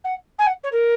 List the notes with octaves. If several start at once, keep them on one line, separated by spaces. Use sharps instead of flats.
F#5
G#5
F#5
C#5
A#4